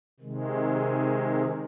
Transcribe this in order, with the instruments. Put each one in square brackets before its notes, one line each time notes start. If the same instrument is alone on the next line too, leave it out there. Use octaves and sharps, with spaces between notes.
[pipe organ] C3 D#3 G#3